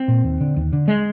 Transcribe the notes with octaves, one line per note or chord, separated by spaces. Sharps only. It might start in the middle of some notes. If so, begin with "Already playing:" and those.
Already playing: C4
A#2
D#2
D3
D#2
D3
G#3